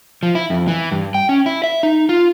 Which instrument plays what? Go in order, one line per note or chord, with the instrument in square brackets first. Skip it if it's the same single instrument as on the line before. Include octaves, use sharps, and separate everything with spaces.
[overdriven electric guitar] F3
E4
F2
E3
G2
G5
C#4
E4
E5
D#4
F4